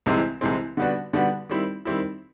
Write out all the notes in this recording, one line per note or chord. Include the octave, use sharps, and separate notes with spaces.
C2 C3 E3 G#3 C4
C2 C3 E3 G#3 C4
D3 G3 B3 D4 F#4
D3 G3 B3 D4 F#4
D#3 G3 C4 E4
D#3 G3 C4 E4